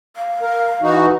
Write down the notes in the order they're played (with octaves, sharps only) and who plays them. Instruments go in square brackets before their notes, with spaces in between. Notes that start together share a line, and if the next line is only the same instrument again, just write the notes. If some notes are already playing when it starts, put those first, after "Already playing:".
[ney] F5
[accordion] A#4
E3 D#4 F#4